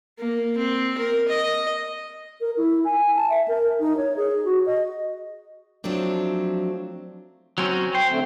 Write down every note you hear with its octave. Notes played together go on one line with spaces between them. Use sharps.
A#3
C4
A#4
D#5
A#4
E4
G#5
A5
E5
A#4
D#4
C#5
G#4
F#4
D#5
F3 F#3 A3 C4 D4
F#3 C4 C#4
C5 G5
D3 A3 C4